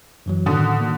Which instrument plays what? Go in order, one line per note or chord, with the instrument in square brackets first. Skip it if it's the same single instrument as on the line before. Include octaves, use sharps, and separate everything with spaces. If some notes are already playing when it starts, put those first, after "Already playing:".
[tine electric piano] F#2 E3 F#3
[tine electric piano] A2 D#3 [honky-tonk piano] D3 F#4 D#6
[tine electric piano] A#3